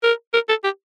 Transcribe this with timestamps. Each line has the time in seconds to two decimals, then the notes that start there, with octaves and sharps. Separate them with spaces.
0.03 A#4
0.34 A#4
0.49 A4
0.64 G4